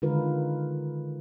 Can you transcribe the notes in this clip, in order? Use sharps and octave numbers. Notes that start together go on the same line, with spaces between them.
D3 D#3 G#3 F4 A#4 B4